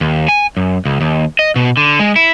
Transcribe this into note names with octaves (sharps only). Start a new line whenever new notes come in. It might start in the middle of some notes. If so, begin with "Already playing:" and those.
D#2
G#5
F#2
C#2
D#2
D#5
B2
D3
G#3
E4